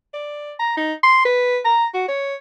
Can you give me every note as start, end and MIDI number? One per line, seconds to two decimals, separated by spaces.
0.13 0.53 74
0.59 0.73 82
0.77 0.93 63
1.03 1.21 84
1.25 1.59 71
1.65 1.85 82
1.94 2.06 66
2.08 2.35 73